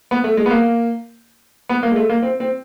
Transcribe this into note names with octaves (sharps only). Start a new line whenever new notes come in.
B3
A3
G#3
B3
A#3
B3
A#3
G#3
A3
A#3
C4
C4